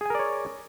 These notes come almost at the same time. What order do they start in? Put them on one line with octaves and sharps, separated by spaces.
G#4 G#5 A#4 D5 C#5